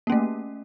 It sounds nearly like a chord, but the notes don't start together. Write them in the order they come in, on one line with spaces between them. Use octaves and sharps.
A#3 C#4 A3